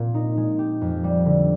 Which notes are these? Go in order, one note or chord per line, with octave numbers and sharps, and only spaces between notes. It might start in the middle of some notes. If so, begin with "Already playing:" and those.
Already playing: A#2 C4 F4
D#4
G#3
G4
F2
G3
D3